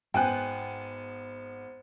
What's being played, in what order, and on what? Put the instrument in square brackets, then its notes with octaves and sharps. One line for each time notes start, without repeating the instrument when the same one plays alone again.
[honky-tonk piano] G#1 B3 F#6 [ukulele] G5 G#5